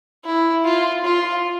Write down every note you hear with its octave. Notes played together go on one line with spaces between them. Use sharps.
E4
F4
F4